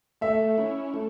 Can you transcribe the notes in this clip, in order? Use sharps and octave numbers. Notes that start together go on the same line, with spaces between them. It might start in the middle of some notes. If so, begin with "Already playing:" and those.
A3 E5
C#4 E4
A3